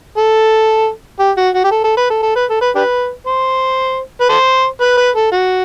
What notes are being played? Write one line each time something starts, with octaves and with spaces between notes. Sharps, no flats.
A4
G4
F#4
F#4
G4
A4
A4
B4
A4
A4
B4
A4
B4
D4 G4 B4
C5
B4
A4 C5
B4
B4
A4
F#4